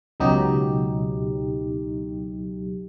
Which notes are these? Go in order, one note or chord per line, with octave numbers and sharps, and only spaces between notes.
C#2 B2 F#3 D#4 G4